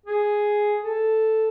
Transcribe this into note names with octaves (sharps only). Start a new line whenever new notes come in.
G#4
A4